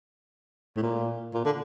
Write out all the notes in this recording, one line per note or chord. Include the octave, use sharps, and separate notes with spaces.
A2
A#2
A#2
D3